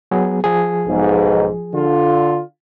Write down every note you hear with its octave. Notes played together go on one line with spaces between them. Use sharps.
F#3 B3 G#4
F3 G#4
B1 G#2
D3 F4